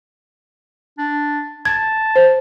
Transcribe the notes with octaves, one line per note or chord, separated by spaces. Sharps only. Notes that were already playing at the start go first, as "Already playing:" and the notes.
D4
A5 G#6
C5